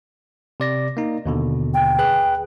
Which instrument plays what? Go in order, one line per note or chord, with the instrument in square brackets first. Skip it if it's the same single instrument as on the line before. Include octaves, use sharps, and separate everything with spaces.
[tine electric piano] C3 D5 A#6
A#3 D#4
D#2 B2 D3
[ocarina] G5
[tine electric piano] G#4 B4 F#6